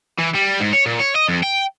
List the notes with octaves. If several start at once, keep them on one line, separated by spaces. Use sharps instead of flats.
E3
G3
G#2
C#5
A#2
C#5
D#5
F2
G5